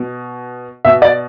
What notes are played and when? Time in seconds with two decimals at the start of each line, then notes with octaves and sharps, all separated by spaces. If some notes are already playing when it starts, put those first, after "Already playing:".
Already playing: B2
0.85 B2 E5
1.02 D5